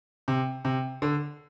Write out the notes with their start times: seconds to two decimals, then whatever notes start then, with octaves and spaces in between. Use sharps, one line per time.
0.28 C3
0.65 C3
1.02 D3